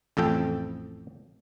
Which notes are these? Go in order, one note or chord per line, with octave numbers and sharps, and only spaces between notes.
A1 F2 A4 G5